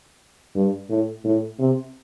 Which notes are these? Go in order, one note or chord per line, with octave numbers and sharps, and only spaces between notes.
G2
A2
A2
C3